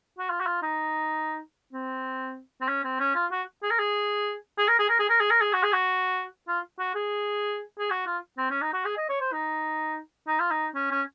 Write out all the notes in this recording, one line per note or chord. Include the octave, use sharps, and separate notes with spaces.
F#4
F4
F#4
F4
D#4
C4
C4
C#4
C4
C#4
F4
F#4
G#4
A#4
G#4
G#4
A#4
G#4
A#4
G#4
A#4
G#4
A#4
G#4
F#4
G#4
F#4
F4
F#4
G#4
G#4
F#4
F4
C4
C#4
D#4
F#4
G#4
D#5
C#5
C5
D#4
D#4
F4
D#4
C#4
C#4